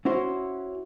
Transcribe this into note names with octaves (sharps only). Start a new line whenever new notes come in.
C#4 E4 F#4 C5